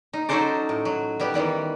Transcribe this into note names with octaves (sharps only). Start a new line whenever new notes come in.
D#4
F#3 C#4 D#4 A4 C5 D5
A2
F#3
G3 B3 G4
D#3 E3 G3 B3